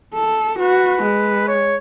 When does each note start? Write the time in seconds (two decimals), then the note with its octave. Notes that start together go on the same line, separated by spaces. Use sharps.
0.14 A4
0.59 F#4 B4
1.03 G#3
1.48 C#5